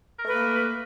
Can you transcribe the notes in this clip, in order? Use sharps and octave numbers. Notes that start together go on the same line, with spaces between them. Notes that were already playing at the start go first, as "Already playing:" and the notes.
A3 A#3 A#4 B4